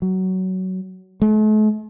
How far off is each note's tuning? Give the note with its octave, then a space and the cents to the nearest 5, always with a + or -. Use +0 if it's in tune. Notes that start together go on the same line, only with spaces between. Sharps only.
F#3 +15
A3 -45